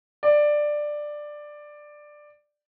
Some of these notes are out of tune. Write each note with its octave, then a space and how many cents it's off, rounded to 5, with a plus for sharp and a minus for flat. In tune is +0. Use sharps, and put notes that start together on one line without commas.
D5 +10